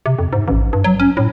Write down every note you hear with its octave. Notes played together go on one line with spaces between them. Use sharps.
C3
F2
G#2
A1
G2
F#3
C#4
A2